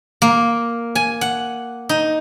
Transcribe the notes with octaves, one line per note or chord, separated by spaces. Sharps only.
A#3
G#5
F#5
D#4